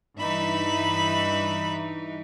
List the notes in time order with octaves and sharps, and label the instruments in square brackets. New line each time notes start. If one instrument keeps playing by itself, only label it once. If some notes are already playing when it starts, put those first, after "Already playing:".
[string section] G2 E3 D#4 [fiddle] E5 B5